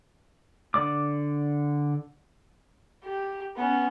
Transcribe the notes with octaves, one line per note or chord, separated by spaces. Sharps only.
D3 D5 D6
G4
B3 C#4